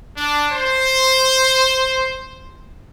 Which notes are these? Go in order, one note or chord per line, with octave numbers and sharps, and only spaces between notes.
D4
C5